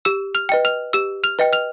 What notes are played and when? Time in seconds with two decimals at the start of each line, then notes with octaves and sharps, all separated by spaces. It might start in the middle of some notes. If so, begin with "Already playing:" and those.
0.05 G4 E6 E7
0.35 F6 F7
0.49 B4 D#5 G5
0.65 F6 F7
0.93 G4 E6 E7
1.24 F6 F7
1.39 B4 D#5 G5
1.53 F6 F7